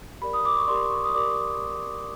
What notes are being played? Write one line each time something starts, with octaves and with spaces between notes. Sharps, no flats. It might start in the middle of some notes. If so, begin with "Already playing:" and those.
G4 A#4 D5 B5
D#6
D6
C#6
G4 A#4 D5 C6
C#6
D#6
G4 A#4 D5 D6